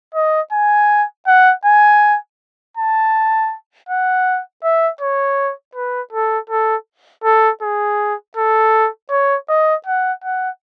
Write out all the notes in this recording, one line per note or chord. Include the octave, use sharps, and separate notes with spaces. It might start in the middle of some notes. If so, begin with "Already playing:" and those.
D#5
G#5
F#5
G#5
A5
F#5
E5
C#5
B4
A4
A4
A4
G#4
A4
C#5
D#5
F#5
F#5